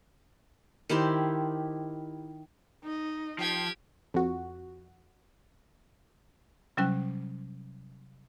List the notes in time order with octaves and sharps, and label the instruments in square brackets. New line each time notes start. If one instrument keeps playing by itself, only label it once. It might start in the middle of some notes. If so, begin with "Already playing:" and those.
[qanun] D#3 E4 G4 C5
[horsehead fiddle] D#4 D#5
[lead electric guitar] F3 [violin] G4 G#6 [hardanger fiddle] G5
[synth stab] F2 F#4
[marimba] C3 F#3 G3 C#4 G5 F#6